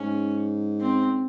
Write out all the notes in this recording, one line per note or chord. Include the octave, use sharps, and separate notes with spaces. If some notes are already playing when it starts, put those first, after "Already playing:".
Already playing: G#2 C#4
C4